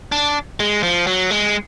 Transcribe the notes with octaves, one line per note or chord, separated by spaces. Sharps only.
D4
G#3
F3
F#3
G#3